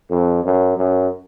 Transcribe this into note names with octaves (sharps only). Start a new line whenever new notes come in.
F2
F#2
F#2